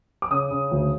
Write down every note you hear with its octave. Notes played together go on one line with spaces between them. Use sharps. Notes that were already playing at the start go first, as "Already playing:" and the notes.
D6
C#3 D#6
C#3
D2